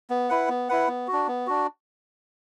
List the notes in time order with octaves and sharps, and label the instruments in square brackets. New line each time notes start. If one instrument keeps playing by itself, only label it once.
[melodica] B3
E4 B4 F#5
B3
E4 B4 F#5
B3
F#4
D4
B3
D4 F#4